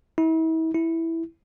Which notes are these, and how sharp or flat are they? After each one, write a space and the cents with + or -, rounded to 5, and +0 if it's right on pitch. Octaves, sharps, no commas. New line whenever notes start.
E4 -40
E4 -5